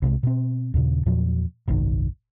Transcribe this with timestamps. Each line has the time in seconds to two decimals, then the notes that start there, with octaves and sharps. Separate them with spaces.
0.02 C2 C3 G3 G#3
0.23 B2 C4
0.74 D#2 A#2 C#3
1.06 E2 A#2 F3 F#3
1.68 F#1 B1 G#2 D#3